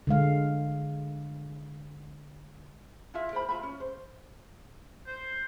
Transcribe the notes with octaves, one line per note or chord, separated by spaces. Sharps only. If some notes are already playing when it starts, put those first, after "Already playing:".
D3 G#3 F5
E4 F4 E5
A#4 C5 B5
F4 E5 B5
C#4
C5
C5